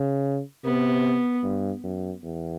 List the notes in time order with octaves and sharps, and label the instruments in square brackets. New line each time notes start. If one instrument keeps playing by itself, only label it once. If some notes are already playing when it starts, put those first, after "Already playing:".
Already playing: [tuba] C#3
[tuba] C3 [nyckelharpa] B3
[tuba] G2
F#2
E2